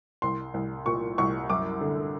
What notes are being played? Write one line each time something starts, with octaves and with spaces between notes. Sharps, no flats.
C2 C6
C2
A#2 C#6
C2 C#6
F#2 D6
D3